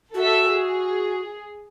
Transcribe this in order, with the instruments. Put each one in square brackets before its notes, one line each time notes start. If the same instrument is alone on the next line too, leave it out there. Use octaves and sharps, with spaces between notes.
[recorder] F#4 [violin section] A4 E5
[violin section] G#4